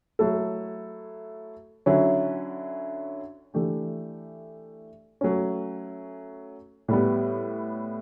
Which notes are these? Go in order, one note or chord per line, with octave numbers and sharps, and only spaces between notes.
F#3 A3 E4 A4
D3 F#3 C#4 E4
E3 A3 D4 G4
F#3 A3 C#4
A2 G3 B3